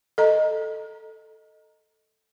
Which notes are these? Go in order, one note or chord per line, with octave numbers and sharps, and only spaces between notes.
A4 D#5 A#5